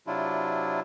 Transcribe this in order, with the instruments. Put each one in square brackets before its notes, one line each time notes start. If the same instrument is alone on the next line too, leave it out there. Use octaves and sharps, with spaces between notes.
[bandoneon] C3 F#3 D4 E4 F4